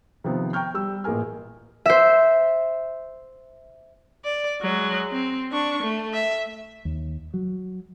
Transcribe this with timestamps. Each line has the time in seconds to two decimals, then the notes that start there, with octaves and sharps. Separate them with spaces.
0.24 C3 D#3 F3 B3
0.53 G5 A#5 C#6 F6 G6
0.74 G3 E6
1.04 A1 A#2 G#4 A#4 G#5 F6
1.86 C5 E5
4.24 D5
4.62 F#3 G#3
5.12 C4
5.52 D4 C#6
5.83 A3
6.14 E5
6.85 D#2
7.34 F#3